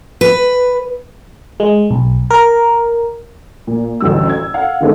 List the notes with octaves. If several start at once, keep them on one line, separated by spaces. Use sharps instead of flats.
B4
G#3
B1
A#4
A#2
A1 D2 G2 E6
G#6
F5 F#5
D3 D#3 G#3 A3 B3 C4